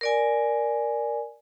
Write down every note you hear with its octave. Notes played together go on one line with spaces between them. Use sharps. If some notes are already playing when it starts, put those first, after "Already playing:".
A#4 D5 G#5